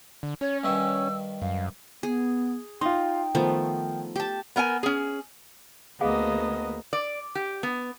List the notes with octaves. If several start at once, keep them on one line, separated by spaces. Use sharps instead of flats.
D3
C#4 C#5
G2 D#3 E5 E6
F#2 F5
B3 G#4
D#4 F4 G5 C6
D#3 F3 A3 B3
G4 A5
B3 A#4 F#5 G#5
C#4 G#4
D2 A#3 B3 G#4 D#5 F5 F#5
D5
G4
B3